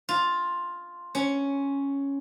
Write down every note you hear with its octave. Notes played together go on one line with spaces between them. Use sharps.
F4
C#4